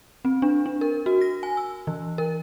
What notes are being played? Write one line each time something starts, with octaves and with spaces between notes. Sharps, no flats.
C4
D4
D4
A#4
F#4
A#6
G#5
E6
E3
A#4